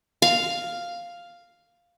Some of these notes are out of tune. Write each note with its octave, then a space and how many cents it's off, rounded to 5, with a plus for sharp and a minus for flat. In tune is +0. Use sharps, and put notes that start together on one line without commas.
F5 +0